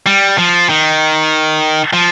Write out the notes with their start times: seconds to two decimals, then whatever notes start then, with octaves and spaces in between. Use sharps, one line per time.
0.06 G3
0.38 F3
0.69 D#3
1.93 F3